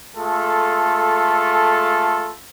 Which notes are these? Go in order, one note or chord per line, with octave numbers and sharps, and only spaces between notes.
G#3 A3 F4 A4